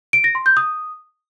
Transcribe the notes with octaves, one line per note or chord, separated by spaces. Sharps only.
D7
A#6
C6
G6
D#6